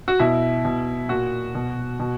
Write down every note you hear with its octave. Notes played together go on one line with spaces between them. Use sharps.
F#4
B2 E4
B2
A#2 F#4
B2
B2